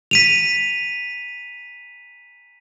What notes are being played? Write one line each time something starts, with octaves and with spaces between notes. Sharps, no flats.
B6 D#7 F7